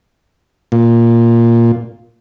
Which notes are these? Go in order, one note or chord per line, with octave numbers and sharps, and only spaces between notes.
A#2